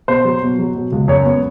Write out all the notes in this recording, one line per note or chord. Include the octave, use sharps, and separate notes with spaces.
B2 C5
F#3
B2
F#3
B2
C#2
F#2 C#5
B3